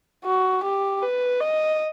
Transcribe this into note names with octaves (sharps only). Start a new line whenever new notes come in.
F#4
G4
B4
D#5